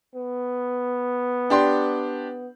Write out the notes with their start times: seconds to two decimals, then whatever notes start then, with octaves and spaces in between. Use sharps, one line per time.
0.15 B3
1.50 D4 G4 C6